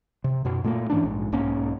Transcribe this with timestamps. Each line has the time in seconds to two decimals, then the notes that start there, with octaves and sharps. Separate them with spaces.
0.24 C3
0.45 F#2 B2
0.64 A#2 A3 A#3
0.90 G#2 E3 C#4 D4
1.03 A#1 G#2
1.32 B1 G#2 A#3 C#4